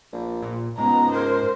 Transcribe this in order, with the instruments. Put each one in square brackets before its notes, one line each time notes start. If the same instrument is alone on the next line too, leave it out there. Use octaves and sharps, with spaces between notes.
[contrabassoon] A#1
[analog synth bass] A#2
[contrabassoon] C#2 [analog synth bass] G#2 [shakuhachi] B3 [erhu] A#5
[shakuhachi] A#4 [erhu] C5